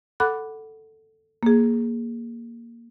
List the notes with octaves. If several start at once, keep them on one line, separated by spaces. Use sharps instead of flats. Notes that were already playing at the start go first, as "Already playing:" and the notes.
A4 F#5 B5 D6 F#6
A#3 G#4